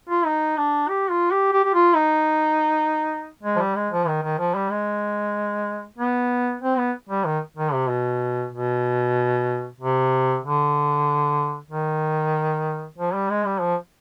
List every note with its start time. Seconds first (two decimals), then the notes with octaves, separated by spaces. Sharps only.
0.10 F4
0.25 D#4
0.57 D4
0.89 G4
1.10 F4
1.31 G4
1.53 G4
1.64 G4
1.74 F4
1.95 D#4
3.43 G#3
3.56 F3
3.59 G3
3.75 G#3
3.91 F3
4.07 D#3
4.23 D#3
4.39 F3
4.55 G3
4.71 G#3
5.98 B3
6.62 C4
6.77 B3
7.09 G3
7.25 D#3
7.57 D#3
7.73 C3
7.89 B2
8.53 B2
9.80 C3
10.43 D3
11.71 D#3
12.98 F3
13.14 G3
13.29 G#3
13.45 G3
13.61 F3